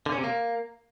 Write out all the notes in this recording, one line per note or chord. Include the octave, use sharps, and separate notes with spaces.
D3
C#4
C3
A#3